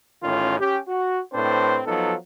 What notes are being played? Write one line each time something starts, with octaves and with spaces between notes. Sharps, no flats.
A1 A2 D#3 C#4 F4
C#4 G4
F#4
A2 C4 D4 B4 C5
F3 F#3 B3 D#4 A4